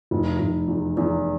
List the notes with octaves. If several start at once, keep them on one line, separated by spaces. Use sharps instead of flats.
F1
F1
E2
E2